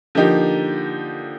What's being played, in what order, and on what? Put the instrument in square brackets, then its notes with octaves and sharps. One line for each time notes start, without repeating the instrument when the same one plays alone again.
[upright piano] D3 F3 A#3 D#4 G4